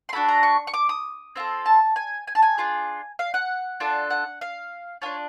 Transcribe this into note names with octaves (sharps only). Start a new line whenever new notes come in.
C6
D4 F#4 A4 B5
A#5
C#6
C#6
D6
D#6
C4 F4 A4
A5
G#5
G#5
A5
G#5
D4 F4 G#4
F5
F#5
D4 F4 A4
F#5
F5
D4 F4 A4 C#5